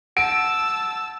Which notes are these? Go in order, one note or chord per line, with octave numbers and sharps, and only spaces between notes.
F#5 A5 E6 D7